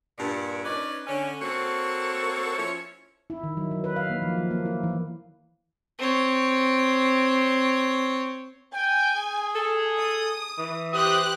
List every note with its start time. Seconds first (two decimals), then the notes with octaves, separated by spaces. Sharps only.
0.18 G2 A#2
0.64 C#4 D#4 B4 D5
1.07 D3 C#4
1.41 A#3 C4 F#4 A4 C#5
2.57 F3 C#4 E4 C#5
3.30 E4
3.43 D#3
3.57 F#3
3.71 F#3
3.84 B4
3.96 F5
4.10 A#3
4.22 F3
4.38 F#3
4.51 A#3
4.66 E4
4.83 E3
5.98 C4 C#5
8.74 G5 G#5
9.16 G#4
9.55 A4
9.98 D#6
10.59 E3
10.93 G4 C5 D#6 F#6